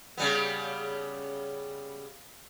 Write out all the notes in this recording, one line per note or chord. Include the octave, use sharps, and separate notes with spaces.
C#3 G3 B3